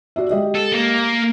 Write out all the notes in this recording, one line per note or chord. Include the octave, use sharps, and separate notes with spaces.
F#4 D5 E5
G#3 G4 D#5
A4
A#3